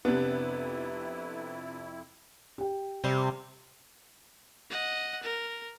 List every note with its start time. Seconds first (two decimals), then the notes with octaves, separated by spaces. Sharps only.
0.05 F2 C3 B3 D4 E4
2.58 G4 G5
3.04 C3 G3 C4 C5
4.70 D#5 F#5
5.23 A#4